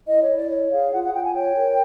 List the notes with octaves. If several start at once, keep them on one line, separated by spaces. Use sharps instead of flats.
E4 D#5
C#5
E4
D5
C#5
G#4 F5
F4 F#5
F#5
F4 G5
G#5
C#5 G5
A#4